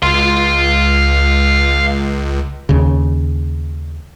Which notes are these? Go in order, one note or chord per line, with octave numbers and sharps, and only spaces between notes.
C#2 F5 C6
D#2 C#3